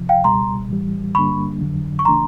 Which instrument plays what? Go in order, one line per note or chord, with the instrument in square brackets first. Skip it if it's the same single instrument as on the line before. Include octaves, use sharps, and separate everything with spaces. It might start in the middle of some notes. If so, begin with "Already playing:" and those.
Already playing: [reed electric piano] C#2 C3 F3
[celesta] F5 G5
[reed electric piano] C#2 B2 G3 [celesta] A#5 C6
[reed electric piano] A2 E3 G3
[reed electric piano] G2 D3 G3 A#3 D4 [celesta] B5 C#6
[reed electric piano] F2 D3 F#3
[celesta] C#6
[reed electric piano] C#3 E3 A3 D4 [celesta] A#5 C6